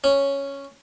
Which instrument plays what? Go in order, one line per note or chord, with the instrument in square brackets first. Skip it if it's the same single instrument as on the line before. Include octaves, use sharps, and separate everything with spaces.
[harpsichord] C#4